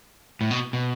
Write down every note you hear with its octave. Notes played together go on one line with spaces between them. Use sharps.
A2
B2
B2